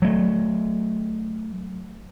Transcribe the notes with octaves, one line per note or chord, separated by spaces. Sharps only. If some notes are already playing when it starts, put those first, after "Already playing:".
F#3 A3